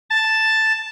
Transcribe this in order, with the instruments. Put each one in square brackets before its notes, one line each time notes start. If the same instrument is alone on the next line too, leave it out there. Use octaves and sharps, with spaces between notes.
[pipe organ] A5